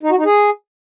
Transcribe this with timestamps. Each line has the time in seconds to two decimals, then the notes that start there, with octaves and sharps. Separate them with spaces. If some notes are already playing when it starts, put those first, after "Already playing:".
0.03 D#4
0.10 F#4
0.18 D#4
0.25 G#4